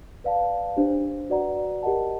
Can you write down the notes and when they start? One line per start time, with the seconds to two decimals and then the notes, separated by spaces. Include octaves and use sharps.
0.24 B4 D5 F5 A5
0.77 D4 G4 C5
1.30 F#4 B4 D5 F#5 A#5
1.83 G4 A#4 D#5 F#5 A5